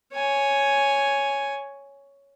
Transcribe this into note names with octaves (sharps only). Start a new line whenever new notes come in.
C#5 G#5